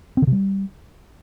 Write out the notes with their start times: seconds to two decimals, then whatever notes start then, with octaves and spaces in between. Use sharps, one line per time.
0.17 C4
0.22 D3
0.27 C3
0.32 G3